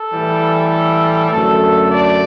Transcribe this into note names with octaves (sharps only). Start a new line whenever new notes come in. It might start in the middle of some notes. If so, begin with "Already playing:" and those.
Already playing: A4
A2 E3 G3
F#2 D3 A3 A4
D5